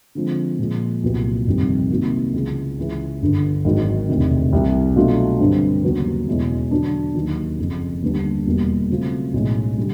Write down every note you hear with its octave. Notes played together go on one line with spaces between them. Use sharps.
D3 F3 G#3 C4
A#2 F3 G#3
C2 A#2 F#3 B3
G1 F2 C3 D#3 G3
C3 D#3 F#3 A#3
C#2 C#3 E3
C#2 C#3 E3
G1 G2 D3
G#1 G#2 D#3 F#3
E1 D2 C3 D#3
C2 C3 E3 G3
B2 F#3 A3 D4 F4
G2 D3 G3 C4
D#2 C#3 F#3 B3
E2 B2 G#3 C#4 E4
D3 F#3 B3 D4
D#2 D#3 F#3
F#1 F2 C#3
D#2 D3 G3 B3 D4
E1 E2 B2 G3 A#3
C#3 F#3 A3 C4 F4
B1 A2 E3 G#3 C#4
D3 G3